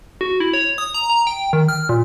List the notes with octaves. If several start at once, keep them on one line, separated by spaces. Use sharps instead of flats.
F#4
E4
C#5
D#6
A#5
A#5
G5
D#3
F6
A#2